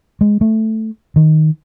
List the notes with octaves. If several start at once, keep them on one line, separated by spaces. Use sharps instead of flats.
G#3
A3
D#3